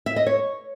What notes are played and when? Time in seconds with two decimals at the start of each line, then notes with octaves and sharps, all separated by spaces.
0.06 E5
0.16 D#5
0.27 C#5